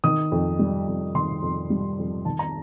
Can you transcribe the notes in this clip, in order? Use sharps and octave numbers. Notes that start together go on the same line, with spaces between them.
D#3 D#6
F2
G3
F2
D#3 C6
F2
G3
F2
D#3 A5
A#5